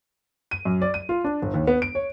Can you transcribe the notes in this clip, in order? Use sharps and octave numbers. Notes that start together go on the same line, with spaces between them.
D#7
F#2
D5
D#7
F4
D4
G1
D#2
B3
D7
C#5